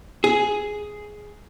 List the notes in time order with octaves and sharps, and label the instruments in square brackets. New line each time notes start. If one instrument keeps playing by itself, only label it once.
[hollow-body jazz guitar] G#4